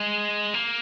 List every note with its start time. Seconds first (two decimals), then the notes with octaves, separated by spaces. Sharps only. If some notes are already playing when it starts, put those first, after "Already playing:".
Already playing: G#3
0.54 A#3